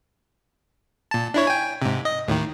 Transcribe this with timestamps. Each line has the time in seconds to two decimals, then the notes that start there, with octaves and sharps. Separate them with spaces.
1.11 A#2 A5
1.34 D4 E4 C#5
1.47 G5 G#5
1.82 G#2 C3
2.05 D#5
2.28 D#2 A2 D#3